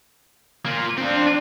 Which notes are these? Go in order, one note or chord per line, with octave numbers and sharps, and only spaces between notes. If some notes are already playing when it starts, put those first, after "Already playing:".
A#3 F4
C4 D4 F4